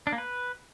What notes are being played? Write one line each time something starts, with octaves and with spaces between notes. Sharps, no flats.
D4
A#3
B4